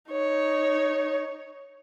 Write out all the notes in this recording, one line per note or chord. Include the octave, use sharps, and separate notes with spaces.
D#4 C#5